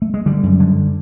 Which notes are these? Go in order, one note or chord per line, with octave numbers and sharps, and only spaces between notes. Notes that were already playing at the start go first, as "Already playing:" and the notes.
A3
G#3
D3 G3
F#2
D3